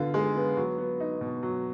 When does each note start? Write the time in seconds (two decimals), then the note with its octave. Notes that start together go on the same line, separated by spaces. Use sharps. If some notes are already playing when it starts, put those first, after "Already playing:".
Already playing: D3 B3 F4
0.14 G#3
0.36 B3
0.57 F#3
0.78 B3
1.00 D#4
1.21 B2
1.43 F#3